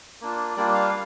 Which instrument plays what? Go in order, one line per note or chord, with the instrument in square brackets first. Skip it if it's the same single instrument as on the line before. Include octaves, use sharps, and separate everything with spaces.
[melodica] A#3 D4 F4
G3 A#3 D4 F4 D5
F5